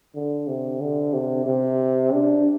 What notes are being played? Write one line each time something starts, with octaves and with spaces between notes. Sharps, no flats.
D3
C3
D3
C3
C3
D4